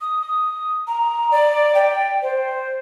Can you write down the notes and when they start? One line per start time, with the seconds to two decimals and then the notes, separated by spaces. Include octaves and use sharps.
0.01 D#6
0.21 D#6
0.87 A#5
1.32 D5
1.75 G5
2.22 C5